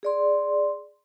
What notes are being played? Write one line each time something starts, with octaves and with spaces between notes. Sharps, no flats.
G#4 D5 C6